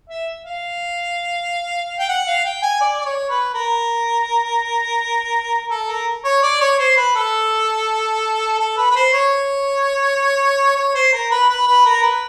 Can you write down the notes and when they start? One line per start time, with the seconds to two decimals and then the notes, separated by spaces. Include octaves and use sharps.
0.10 E5
0.46 F5
1.99 G5
2.09 F#5
2.27 F5
2.45 G5
2.63 G#5
2.81 D5
3.00 D5
3.05 C#5
3.30 B4
3.54 A#4
5.70 A4
5.88 A#4
6.25 C#5
6.43 D5
6.61 C#5
6.79 C5
6.97 B4
7.15 A4
8.60 A4
8.77 B4
8.91 B4
8.96 C5
9.14 C#5
10.76 C#5
10.95 C5
11.13 A#4
11.31 B4
11.49 B4
11.67 B4
11.86 A#4
12.03 B4